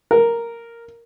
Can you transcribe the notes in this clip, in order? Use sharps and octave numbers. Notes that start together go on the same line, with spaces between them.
A#4